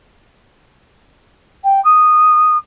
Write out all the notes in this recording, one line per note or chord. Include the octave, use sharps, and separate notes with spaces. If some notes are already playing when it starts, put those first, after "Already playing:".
G5
D#6